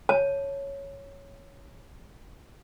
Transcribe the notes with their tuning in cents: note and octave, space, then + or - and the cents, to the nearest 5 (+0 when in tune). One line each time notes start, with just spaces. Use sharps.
C#5 +0 A5 +0